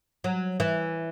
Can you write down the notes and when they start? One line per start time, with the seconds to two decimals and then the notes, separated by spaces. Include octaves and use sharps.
0.24 F#3
0.60 E3